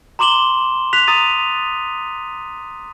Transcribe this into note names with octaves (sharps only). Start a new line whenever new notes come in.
A#5 C6 D6 E7 F#7 G7
F#6 B6 F7
A#5 D#6 A6 D#7